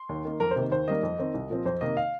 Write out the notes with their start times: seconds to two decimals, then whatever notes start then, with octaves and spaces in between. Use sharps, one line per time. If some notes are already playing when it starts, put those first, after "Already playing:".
Already playing: C6
0.09 D#2
0.25 D#3 A#3
0.40 F2 A#4
0.51 C5
0.56 C3 D#3 A#3
0.71 D#2 C5
0.88 D#3 G3 A#3 D#5
1.03 F2
1.19 D#3 C4
1.34 C2
1.50 A#2 F3 C4
1.66 F2 C5
1.81 C3 D#3 A#3 D#5
1.97 F5